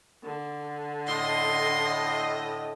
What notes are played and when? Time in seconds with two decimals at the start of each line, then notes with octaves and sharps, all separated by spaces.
0.24 D3
1.08 A2 D#5 C6